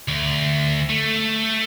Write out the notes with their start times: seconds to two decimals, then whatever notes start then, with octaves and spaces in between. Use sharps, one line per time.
0.08 D2
0.90 A3